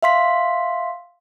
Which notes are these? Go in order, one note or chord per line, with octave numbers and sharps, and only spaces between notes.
E5 F5 C6 B6